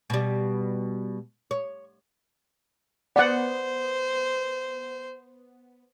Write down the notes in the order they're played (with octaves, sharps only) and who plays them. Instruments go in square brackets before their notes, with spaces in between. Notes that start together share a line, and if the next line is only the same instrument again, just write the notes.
[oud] B2 G3
C#5
[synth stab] B3 [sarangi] C5 [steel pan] D5 F#5